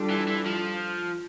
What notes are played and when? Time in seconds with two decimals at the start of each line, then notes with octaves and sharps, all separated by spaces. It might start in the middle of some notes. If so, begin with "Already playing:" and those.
Already playing: G3 D4 F4 A4
0.10 E3
0.27 E3
0.46 F3